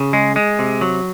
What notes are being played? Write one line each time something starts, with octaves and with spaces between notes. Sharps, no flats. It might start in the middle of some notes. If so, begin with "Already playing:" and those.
Already playing: C#3
G#3
G#3
C3
F#3